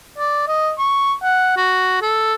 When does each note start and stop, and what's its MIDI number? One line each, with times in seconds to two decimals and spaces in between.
0.19 0.44 74
0.48 0.71 75
0.79 1.13 85
1.22 1.52 78
1.57 1.97 66
2.02 2.34 69